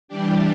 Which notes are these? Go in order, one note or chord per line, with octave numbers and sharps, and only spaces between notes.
E3 G3 D4 G4